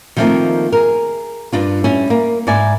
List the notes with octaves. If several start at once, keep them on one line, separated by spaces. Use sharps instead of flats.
D#3 F3 A3 A#3 C4 D#4
G#4 A#4
G2 D4 F4
G3 C#4 E4
A#3
G#2 E4 D5 G#5